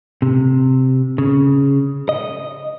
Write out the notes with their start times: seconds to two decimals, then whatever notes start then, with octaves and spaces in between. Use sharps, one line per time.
0.22 C3
1.18 C#3
2.09 D#5